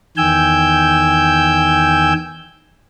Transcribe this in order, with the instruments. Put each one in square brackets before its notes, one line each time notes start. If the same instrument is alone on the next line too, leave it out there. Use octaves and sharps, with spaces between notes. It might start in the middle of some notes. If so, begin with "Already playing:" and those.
[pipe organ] E2 D#3 G5 G#5 E6 G6